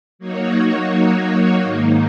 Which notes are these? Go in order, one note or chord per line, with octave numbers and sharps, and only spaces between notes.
F#3 A#3 D#4 F#4 C#5
G#2 D#3 A#3 D#4